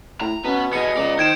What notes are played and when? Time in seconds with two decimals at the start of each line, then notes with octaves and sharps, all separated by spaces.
0.21 A2 A#5
0.45 B2 B3 C#4
0.73 B3 G#4 D#5 C#7
0.97 C#2 D5 A#5
1.19 D#3 C5 G#6 D7 E7